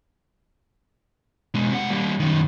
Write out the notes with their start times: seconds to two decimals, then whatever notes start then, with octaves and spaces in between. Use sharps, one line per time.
1.54 B2 G#3
1.71 C3 F#5
1.90 G3 A#3
2.20 F#2 D#3